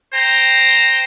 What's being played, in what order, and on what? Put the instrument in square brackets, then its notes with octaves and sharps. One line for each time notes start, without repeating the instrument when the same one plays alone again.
[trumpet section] C5 G5 A#5